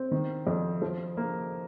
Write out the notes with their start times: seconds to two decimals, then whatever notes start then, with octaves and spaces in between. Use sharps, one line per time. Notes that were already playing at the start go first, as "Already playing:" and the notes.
Already playing: C4
0.11 D#3
0.47 F2
0.82 F3
1.17 A#3